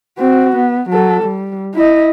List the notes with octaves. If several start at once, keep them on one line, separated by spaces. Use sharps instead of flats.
C4 F#4
B3
F#3 A4
G3
E4 D#5